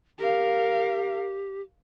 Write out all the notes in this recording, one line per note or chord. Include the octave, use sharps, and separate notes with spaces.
G4 A#4 F5